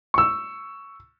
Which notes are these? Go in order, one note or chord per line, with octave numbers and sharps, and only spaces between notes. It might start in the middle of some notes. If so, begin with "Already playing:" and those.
C#6 E6